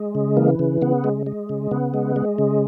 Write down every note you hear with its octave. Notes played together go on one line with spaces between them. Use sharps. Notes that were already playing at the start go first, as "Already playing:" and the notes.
Already playing: G#3
C#3
E3 A#3
C#3
C#3 B3
G#3
G#3
C#3
C#3 B3
G#3
G#3
C#3